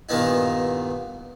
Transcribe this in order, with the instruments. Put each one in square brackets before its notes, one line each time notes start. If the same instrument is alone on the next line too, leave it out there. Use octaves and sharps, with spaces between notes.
[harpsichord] G2 A#2 D#3 B3 D#4 E4